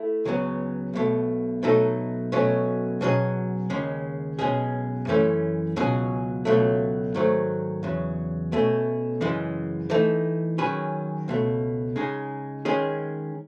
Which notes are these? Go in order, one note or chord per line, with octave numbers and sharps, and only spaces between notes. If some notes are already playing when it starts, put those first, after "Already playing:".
Already playing: A3 E4
C#2 C#3 F#3 B3
B1 B2 A3
B2 F#3 A3 D#4 A4
B2 F#3 A3 C#4
B2 F#3 C#4 G#4 D#5
D#2 C#3 G#3 C#4
B1 B2 G#3 C#4 G#4
F#2 E3 A3 C#4
C#2 B2 F#3 C#4 G#4
C#2 B2 F#3 A3
G#2 D#3 F#3 A3
E2 C#3 F#3
B2 A3 C#4
F#2 C#3 E3 G#3
E3 A3 D#4
D#3 F#3 C#4 G#4 B4
C#2 B2 A3
C#3 G#3 D#4 G#4
D#3 G#3 C#4 G#4